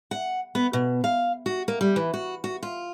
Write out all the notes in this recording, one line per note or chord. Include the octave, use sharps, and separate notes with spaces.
F#5
B3
B2
F5
F#4
A#3
G3
E3
F#4
F#4
F4